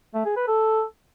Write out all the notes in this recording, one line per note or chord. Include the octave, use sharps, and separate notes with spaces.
A3
G#4
B4
A4